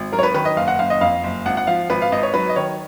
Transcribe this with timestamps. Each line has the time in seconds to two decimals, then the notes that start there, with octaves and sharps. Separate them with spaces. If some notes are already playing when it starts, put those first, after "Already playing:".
Already playing: G#1
0.12 F#3 A#4
0.19 C#5
0.23 B4
0.34 D#3 B4
0.45 D#5
0.57 F#1 F5
0.68 F#5
0.79 F#1 F5
0.90 D#5
1.01 F2 F5
1.24 F#1
1.45 G#1 F#5
1.57 F#5
1.67 F3 F5
1.90 G#1 B4
2.02 F5
2.12 G#1 D#5
2.23 C#5
2.34 F#3 B4
2.49 D#5
2.56 D#3 C#5